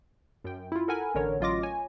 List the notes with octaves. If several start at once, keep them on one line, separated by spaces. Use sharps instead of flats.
F#2 G5
E4 F4
A4 A#4 F#5 G#5 B5
A1 D3 A#4 C#5
A1 F#3 F4 D#5 D6 A#6
C#5 G#5